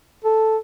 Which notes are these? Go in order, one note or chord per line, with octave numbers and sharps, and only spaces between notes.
A4